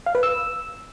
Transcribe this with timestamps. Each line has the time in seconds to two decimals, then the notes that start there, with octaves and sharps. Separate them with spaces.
0.06 F5
0.15 B4
0.23 E6